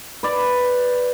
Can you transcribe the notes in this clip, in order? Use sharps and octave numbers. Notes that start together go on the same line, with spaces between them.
B4 D5